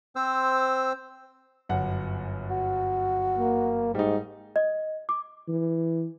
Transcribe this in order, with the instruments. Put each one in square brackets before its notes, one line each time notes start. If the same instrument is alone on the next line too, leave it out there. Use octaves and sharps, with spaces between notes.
[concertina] C4 C5 E6
[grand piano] G1 F#2 F#5
[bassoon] F#4
[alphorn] A#3
[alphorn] G#2 [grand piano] G3 D#4
[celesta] D#5
D6
[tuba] E3